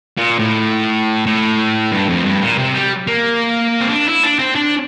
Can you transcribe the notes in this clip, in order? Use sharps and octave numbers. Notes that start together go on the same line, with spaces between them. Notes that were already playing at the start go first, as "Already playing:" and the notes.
A#2
A2
A2
G2
F2
G2
A#2
C3
G3
A#3
C4
D4
E4
D4
C4
D4